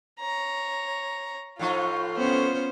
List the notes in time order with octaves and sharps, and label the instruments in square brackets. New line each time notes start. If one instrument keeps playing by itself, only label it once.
[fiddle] C#5 A#5
[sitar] A2 F3 D#4 [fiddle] F4
[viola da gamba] B3 C#4 C5